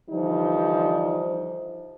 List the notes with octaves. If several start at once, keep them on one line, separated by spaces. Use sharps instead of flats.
D3 E3 F3 G3 D#4